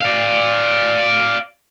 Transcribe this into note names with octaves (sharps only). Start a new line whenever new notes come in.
D5 F5